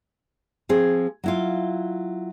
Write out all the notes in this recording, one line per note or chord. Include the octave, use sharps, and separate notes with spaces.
F3 C4 G#4
F#3 E4 F4